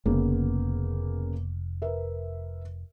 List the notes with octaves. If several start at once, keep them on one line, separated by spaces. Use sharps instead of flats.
F1 C#3 A#3 B3
A#4 B4 E5